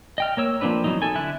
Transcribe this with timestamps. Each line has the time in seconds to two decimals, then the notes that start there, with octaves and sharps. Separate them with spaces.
0.18 D#5 G5 F6
0.37 A#3 C#5 E6
0.61 F3 A#3 C4 D4 B4
0.84 E3 F#3 B3 D#4
1.02 A4 G#5
1.15 D3 E4 E5 F#6